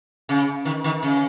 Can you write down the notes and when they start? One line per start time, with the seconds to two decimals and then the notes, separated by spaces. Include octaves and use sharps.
0.29 C#3
0.65 D#3
0.84 D#3
1.03 C#3